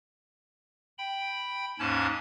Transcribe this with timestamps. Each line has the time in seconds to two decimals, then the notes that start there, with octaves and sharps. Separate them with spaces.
0.98 G5 B5
1.79 D#2 G#2 C#4 A5 G#6